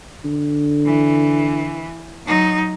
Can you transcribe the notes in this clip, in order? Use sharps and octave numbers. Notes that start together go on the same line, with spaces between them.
D3
E3
F#3 D#4